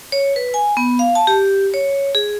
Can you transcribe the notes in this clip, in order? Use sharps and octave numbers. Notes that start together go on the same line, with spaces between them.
C#5
B4
G#5
B3
F5
A5
G4
C#5
G#4